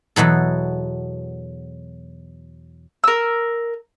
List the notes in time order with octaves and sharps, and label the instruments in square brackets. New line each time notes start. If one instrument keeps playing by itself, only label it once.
[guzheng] E2 B2 F#3 A4
[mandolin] A#4 E6